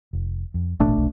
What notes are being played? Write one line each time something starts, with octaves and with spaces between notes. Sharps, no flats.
F1
F2
E1 A1 B2 A3 D4
C2